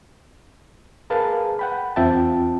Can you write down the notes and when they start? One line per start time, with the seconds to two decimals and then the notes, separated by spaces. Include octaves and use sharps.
1.10 G#4 A#4 B4 F5 G#5 A5
1.59 F#5 G5 B5
1.96 E2 C4 F4 E5 G5 A5